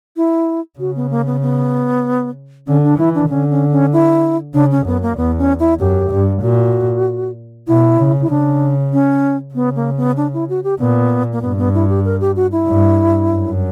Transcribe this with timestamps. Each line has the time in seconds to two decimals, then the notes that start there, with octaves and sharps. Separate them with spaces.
0.17 E4
0.79 C#3 F#4
0.96 B3
1.11 A#3
1.26 B3
1.42 B3
2.67 D3 C#4
2.83 D4
2.98 E3 E4
3.15 D4
3.29 D3 C#4
3.50 C#4
3.72 C#4
3.93 E4
4.54 C#3 D4
4.71 C#4
4.86 F#2 B3
5.02 A#3
5.17 E2 B3
5.38 C#4
5.60 E4
5.80 F#2 G4
6.11 G2
6.42 A#2 F#4
7.67 B2 E4
7.99 C#3
8.22 E4
8.30 C#3 D4
8.93 C#4
9.54 C#3 B3
9.76 A#3
9.97 B3
10.17 D4
10.34 E4
10.49 F#4
10.64 G4
10.79 A#2 B3
11.32 A#3
11.42 G2 B3
11.58 B3
11.74 E4
11.89 G4
12.05 A#4
12.21 G4
12.36 F#4
12.52 E4
12.67 G2
13.31 F#2